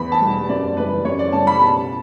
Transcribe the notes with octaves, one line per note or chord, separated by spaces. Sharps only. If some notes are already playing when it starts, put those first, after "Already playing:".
Already playing: E2 B5
A5
B2 G3
F#2 D5
C#3 E3 G3 B4
F#2 C#5
D5
C#3 E3 G3 A5
B5
B2 A5